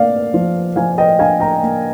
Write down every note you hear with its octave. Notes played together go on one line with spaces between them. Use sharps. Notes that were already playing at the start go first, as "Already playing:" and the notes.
Already playing: A#3 D4 D5 F5
F3
F3 F5 G#5
D#5 G5
D4 F5 G#5
G5 A#5
A#3